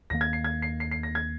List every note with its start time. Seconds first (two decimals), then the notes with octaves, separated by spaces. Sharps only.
0.10 D#2 D#3 A#3 A#6
0.21 G#6
0.33 C7
0.44 G#6
0.62 C7
0.80 C7
0.91 C7
1.03 A#6
1.15 G#6